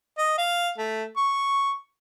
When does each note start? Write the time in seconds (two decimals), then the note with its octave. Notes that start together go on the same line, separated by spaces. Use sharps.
0.18 D#5
0.38 F5
0.78 A3
1.17 C#6